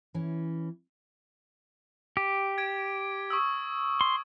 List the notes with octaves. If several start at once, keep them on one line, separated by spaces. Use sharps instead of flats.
E3 C#4
G4
G#6 D7
C#6 D#6 E6
C6